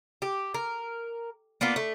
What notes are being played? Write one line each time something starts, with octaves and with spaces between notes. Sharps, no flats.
G4
A#4
A#3 B3 D4 F4
A3